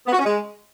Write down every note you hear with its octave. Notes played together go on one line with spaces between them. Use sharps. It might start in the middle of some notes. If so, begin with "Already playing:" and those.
B3
F#4
C#4
G#3